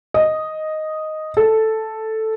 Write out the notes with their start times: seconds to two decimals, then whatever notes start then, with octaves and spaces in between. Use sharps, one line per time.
0.14 D#5
1.37 A4